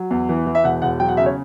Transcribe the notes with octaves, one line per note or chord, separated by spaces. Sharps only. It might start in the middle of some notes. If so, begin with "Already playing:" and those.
Already playing: F#3
E2
E3
E3
E5
E1 F#5
E1 F#5
F#3 G5
F#5
C#3 E5
C#5